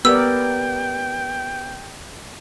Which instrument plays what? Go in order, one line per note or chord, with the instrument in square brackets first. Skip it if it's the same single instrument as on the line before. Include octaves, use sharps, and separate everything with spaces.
[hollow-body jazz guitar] B3 [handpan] G4 A#4 D5 [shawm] G5 [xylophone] E6